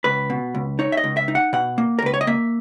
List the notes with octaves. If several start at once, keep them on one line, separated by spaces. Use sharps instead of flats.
C#2 B4
B2
C#2
D#4 C#5
E5
D#5
C#2
E5
D#4
F#5
B2 F#5
A#3
A#4
C#2 B4
C#5
D#5
A#3 E5